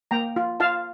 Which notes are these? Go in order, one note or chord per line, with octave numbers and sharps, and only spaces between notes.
A#3 G5 A#5
F4
F4 F5 A5